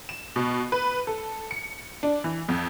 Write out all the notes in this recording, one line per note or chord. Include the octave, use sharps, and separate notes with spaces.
E7
B2
B4
A4
C#7
D4
E3
F2